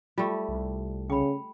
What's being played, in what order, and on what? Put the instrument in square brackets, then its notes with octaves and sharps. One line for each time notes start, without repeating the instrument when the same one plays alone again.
[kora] G3 A3 [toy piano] F4
[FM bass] C2
[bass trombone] C#3 [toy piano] G5 B5